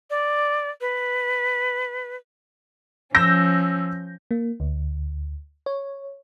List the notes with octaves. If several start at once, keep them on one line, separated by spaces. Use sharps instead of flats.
D5
B4
F3 C#4 E6 G6 A#6
A#3
D2
C#5